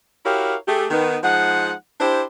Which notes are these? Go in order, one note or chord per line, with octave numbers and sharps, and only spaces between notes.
E4 F#4 G4 A#4 C#5 F5
A3 G4 G#4
D#3 B3
F3 G#3 D#4 F#5
D4 E4 G4 C5